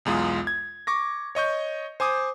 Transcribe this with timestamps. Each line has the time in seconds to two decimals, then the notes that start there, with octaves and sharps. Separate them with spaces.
0.05 B1 E2 G#3 F4 D#6
0.47 G#6
0.87 C#6 D6 A#6
1.35 C#5 D#5 C#6 G6
2.00 C5 G#5 D6 D#6